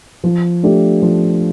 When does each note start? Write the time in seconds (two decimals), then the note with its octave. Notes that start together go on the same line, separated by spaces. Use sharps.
0.24 F3
0.63 A3 D4 G4
1.02 F3